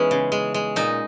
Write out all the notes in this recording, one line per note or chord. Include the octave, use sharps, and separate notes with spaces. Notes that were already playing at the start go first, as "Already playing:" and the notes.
Already playing: E3 G#3 B3 C#4 D#4
C#3
G#3
G#3
A#2 D#4